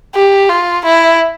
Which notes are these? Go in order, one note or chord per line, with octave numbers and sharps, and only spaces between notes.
G4
F4
E4